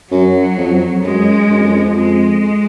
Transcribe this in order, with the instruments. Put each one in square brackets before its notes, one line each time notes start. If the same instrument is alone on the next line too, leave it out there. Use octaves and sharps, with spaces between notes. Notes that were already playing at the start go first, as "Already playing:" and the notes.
[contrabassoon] F#2 [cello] F#3
[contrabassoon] F2
[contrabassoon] F#2 [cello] G#3
[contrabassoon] F#2
F2
F2
[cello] G#3